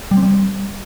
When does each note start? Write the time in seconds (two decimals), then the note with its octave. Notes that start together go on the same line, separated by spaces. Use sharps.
0.11 G3
0.17 C4
0.23 G3